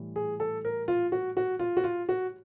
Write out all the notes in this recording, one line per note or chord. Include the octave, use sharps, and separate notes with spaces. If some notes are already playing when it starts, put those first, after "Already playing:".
Already playing: A2 E3 G3
G#4
A4
A#4
F4
F#4
F#4
F4
F#4
F4
F#4